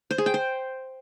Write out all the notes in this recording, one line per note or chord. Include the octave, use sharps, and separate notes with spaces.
C5
G#4
G5
C5